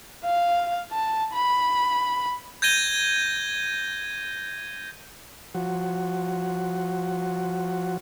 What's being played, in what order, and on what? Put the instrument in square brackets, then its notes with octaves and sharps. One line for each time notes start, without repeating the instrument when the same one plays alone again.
[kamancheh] F5
A5
B5
[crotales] G6 G#6 A#6 D#7 G7
[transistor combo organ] F3 F#4